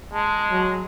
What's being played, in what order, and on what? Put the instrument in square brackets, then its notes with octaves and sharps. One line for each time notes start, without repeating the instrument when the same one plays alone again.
[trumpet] G#3 [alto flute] A5
[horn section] F#3